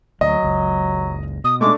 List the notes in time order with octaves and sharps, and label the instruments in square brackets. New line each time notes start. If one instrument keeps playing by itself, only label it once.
[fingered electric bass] D2 [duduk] F#3 [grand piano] D#5
[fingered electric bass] F#1 C#2
[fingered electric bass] B2 [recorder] D#6
[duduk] G#3 [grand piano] A3 D4 [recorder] D6